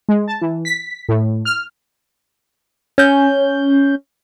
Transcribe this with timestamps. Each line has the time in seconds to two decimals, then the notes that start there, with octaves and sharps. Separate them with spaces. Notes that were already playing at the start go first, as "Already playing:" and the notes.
0.09 G#3
0.28 A5
0.41 E3
0.65 B6
1.09 A2
1.45 F6
2.98 C#4 G6